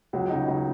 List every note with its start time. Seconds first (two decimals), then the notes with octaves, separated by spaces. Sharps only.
0.13 C#2 F#3 F#4
0.30 C#3 F#3 D#4
0.48 C#2 D#4